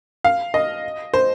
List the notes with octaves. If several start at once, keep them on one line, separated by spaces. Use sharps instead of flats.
F5
D#5
C5